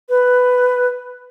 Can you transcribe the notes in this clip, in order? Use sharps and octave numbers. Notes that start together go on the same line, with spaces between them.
B4